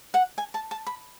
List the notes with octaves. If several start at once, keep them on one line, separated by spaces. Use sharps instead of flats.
F#5
G#5
A5
A5
B5